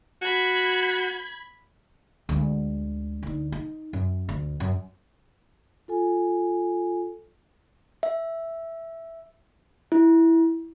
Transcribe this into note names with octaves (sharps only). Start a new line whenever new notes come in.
F#4 B5 G#6
D2 G#3
D2 D#4
D#4
F#2
D2
F#2
F4 A4 G#5
E5
E4